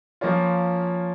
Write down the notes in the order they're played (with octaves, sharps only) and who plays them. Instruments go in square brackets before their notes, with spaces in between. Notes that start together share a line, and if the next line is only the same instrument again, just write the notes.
[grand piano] F3 A#3 C#4 F4